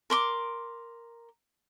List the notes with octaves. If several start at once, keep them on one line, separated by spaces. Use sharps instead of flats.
A#4 C6 D6